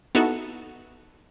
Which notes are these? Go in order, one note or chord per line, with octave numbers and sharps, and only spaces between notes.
B3 D#4 E4 F#4 A4